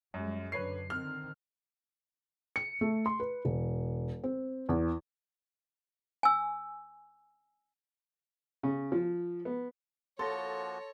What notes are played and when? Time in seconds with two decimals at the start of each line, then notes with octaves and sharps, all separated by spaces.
0.14 F#2 G3 G#3
0.52 F#2 D3 B4 C#5 C7
0.90 D3 D#3 C4 F6
2.56 C#7
2.81 A3
3.06 C6
3.20 B4
3.45 E1
4.24 C4
4.69 E2
6.23 G#5 E6
8.63 C#3
8.92 F3
9.45 B3
10.19 F3 A#3 F#4 A4 C#5 C6 A6 A#6